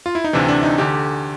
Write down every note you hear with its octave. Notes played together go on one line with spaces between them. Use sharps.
F4
E4
D#4
D2 C3 E3 D4
D4
D#4
D2 D3 G4